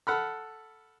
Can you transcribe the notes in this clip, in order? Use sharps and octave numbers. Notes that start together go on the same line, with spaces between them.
A4 F#5 B5 F6